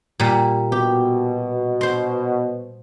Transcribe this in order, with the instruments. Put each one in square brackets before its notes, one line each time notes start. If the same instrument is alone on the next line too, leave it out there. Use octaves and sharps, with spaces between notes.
[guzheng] A#2 G3
[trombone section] B2 [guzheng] G4
[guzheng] C5 C6